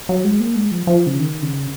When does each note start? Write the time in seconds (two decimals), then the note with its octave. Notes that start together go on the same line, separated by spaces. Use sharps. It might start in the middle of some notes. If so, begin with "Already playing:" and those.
0.09 F#3
0.24 G#3
0.40 A#3
0.56 G#3
0.71 F3
0.87 F3
1.07 C#3
1.19 D#3
1.42 C#3